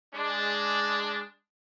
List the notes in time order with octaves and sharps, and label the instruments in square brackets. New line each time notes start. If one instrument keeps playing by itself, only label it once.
[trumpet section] G#3 D4